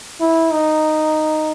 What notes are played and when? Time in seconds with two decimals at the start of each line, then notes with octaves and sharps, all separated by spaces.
0.20 E4
0.51 D#4